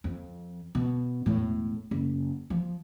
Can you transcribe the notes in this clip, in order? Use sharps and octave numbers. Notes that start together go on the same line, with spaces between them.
F2
B2
E1 A2
F#1
F3